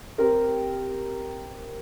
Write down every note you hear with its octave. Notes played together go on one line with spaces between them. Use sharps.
C4 G4 A#4